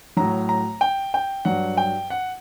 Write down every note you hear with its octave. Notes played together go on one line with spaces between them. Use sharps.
A2 F#3 A#5
A#5
G5
G5
G2 F#3 F#5
G5
F#5